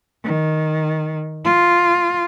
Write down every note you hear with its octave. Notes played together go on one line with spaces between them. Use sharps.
D#3
F4